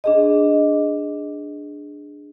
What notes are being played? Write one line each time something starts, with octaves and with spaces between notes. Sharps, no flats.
D4 G#4 D#5